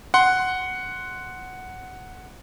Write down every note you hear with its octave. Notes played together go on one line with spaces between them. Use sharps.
F#5 C6